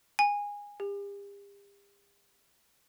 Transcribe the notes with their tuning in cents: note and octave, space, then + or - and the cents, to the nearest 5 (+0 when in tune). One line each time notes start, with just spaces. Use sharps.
G#5 -20
G4 +40